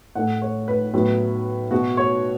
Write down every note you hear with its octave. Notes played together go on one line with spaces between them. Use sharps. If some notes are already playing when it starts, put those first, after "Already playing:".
A2 A3 F#5
C#5
B4
A2 F#3 B3
B2 B3 F#4
C#5